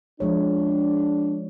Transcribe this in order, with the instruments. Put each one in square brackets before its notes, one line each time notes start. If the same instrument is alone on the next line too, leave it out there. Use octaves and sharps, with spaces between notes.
[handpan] F3 G#3 C#5 [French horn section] D4